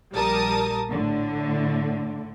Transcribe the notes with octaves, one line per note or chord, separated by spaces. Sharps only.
A#1 G3 A#4 A5 D#6
A2 D3